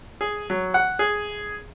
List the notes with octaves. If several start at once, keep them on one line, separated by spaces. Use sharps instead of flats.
G#4
F#3
F#5
G#4